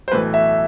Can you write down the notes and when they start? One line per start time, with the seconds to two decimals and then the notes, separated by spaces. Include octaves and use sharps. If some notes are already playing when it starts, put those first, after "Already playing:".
0.08 C5
0.12 B1 A2 E3 A3 B4
0.34 E5